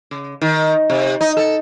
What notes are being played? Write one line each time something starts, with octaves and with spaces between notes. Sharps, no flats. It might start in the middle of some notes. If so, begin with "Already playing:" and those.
C#3
D#3
C3
D#4
A4